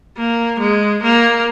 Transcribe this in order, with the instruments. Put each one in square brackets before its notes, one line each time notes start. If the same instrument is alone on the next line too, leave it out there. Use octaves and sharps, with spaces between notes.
[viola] A#3
G#3
A#3